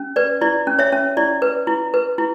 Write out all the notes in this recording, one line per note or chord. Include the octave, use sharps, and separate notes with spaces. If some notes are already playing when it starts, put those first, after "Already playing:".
Already playing: C#4
B4 D5
E4 D5
C#4
C#5 E5
C#4
E4 D5
B4
E4
B4
E4